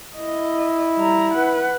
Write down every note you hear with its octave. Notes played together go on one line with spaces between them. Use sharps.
E4 D#5
G3 A#5
B4 F#5